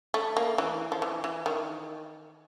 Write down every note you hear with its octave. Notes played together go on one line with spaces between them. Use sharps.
A3
A#3
E3
F3
E3
E3
D#3